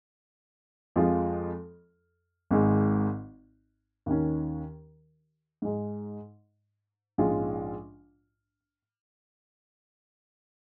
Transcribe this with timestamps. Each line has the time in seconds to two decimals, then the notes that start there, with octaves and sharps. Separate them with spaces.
0.96 F2 F3 G#3 F4
2.51 G#1 G#2 G#3
4.06 D#2 D#3 C#4
5.62 G#2 G#3 D#4
7.18 A#1 G#2 G#3 C#4 F4